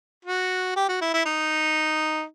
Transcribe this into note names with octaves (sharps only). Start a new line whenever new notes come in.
F#4
G4
F#4
E4
E4
D#4